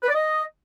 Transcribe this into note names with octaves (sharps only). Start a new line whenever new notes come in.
B4
D5
D#5